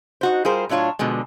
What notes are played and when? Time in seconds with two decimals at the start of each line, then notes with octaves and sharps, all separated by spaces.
0.21 D#4 F#4 C5
0.45 G3 F4 G#4 A#4 C5
0.69 A2 F#3 D4 F4 C#5
0.99 B2 D3 F3 G#3